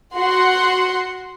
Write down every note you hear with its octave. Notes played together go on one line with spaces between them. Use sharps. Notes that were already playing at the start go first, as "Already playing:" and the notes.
F#4 F#5 C6